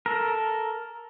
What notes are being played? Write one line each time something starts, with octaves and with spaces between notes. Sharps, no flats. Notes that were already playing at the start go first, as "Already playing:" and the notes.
A4 A#4